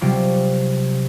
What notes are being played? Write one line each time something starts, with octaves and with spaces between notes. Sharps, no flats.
C3 F#3 G3 F4 D6